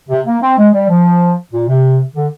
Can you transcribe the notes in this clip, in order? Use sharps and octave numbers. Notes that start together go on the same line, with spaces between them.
C3
A#3
C4
G#3
G3
F3
A#2
C3
D3